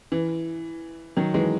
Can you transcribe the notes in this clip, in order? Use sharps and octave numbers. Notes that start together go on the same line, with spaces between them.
E3
D#3 F#3
E3 G#3